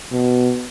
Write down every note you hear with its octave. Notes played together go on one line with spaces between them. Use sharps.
B2